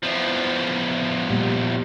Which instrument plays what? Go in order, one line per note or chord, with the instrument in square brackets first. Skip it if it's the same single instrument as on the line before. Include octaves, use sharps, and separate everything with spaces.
[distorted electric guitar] E2 F3
[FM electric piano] A#2 G3